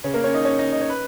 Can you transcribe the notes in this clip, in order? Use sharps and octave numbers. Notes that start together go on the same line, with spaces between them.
C#3 C#4
A#3 A#4
C#4 C#5
D#4 D#5
C#4 C#5
D#4 D#5
D#5
C#5
B4